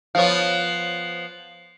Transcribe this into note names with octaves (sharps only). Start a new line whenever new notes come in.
F3 B3 C#5 F5